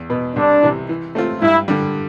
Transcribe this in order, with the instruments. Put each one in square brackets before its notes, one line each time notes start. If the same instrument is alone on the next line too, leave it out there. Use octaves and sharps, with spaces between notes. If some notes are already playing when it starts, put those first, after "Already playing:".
Already playing: [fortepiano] E2
B2 B3
[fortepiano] C2 [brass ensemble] D4
[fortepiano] C3 E3
E3
A3 C4 F4
[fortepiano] G2 [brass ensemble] E4
[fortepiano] D3 G3